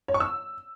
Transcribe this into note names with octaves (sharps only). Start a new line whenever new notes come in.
C#5
C#6
E6